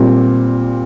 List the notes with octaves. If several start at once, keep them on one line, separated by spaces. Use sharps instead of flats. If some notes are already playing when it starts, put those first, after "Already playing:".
Already playing: A#2 G3 C4